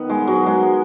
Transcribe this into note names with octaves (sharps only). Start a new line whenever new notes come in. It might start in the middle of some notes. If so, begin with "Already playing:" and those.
Already playing: D#3 B3
G#3
F#3
G#3